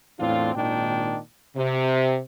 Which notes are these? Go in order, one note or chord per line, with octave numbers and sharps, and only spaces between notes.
E2 A2 C4 D4 F4
G#1 A#2 D#3 D4 G5
C3